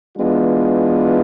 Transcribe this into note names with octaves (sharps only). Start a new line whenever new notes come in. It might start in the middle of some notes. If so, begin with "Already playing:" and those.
E3 G#3 B3 D4 F4